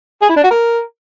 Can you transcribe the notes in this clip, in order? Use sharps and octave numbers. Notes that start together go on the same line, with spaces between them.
G#4
E4
D4
F#4
A#4